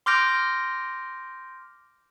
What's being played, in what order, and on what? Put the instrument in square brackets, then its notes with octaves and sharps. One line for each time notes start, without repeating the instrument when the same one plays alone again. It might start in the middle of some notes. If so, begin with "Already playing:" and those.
[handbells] C6 D6 F6 G6 A#6 D7